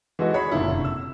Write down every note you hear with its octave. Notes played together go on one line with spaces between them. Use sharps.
E3 G#3 F#4 A4 D#5
G#4 C#5 B5
F#1 A#2 D3 E4
F1
E6